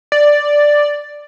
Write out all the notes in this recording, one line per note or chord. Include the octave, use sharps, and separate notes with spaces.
D5